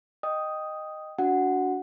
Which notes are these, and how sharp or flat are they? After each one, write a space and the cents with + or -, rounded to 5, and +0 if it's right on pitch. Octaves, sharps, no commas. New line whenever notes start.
D#5 -10 G5 +0 D#6 +5
D4 -30 F#4 +0 F#5 +0